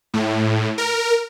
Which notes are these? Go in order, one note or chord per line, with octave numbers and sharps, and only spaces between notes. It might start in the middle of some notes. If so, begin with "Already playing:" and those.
A2
A#4